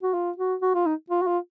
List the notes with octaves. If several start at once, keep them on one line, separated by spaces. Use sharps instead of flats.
F#4
F4
F#4
F#4
F4
D#4
F4
F#4
F4